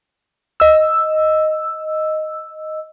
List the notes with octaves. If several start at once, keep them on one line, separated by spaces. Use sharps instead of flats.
D#5 E6